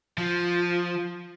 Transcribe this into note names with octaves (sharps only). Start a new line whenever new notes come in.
F3